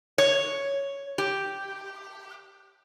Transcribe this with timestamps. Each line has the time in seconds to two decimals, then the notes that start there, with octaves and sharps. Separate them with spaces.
0.18 C#5
1.18 G4